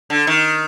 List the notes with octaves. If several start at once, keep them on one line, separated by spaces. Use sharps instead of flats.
D3
D#3